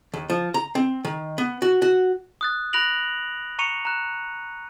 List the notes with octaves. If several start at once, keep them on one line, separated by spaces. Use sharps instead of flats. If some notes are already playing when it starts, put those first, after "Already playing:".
D#2
F3
A#5
C4
D#3
B3
F#4
F#4
D#6 F#6 A6
B5 F#6 A#6 D7 F7 F#7
A#5 C#6 C#7 D#7 F7
A#5 F#6